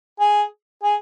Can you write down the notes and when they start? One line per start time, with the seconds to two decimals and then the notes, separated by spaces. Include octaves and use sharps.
0.20 G#4
0.83 G#4